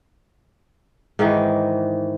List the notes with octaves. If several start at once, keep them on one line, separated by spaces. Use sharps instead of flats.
G#2 D#3 E3 D#4